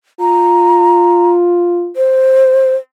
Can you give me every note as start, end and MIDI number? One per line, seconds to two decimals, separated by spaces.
0.20 1.92 65
0.20 1.30 82
1.96 2.76 72